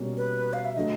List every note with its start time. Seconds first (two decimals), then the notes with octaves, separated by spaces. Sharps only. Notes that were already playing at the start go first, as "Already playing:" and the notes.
Already playing: B2 G3 A#3 C#4 F#4
0.17 B4
0.53 F5
0.65 E5
0.75 D3 F#3 A3 D#5